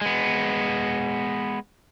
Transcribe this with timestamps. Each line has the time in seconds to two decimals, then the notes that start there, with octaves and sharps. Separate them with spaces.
0.01 G#3 B3